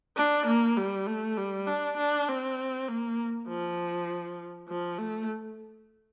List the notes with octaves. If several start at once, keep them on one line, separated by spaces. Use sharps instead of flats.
D4
A#3
G3
A3
G3
D4
D4
C4
A#3
F3
F3
A3